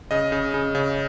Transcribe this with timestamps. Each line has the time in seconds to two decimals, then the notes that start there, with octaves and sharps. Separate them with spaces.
0.11 C#3 D#5
0.32 C#3
0.54 C#3
0.75 C#3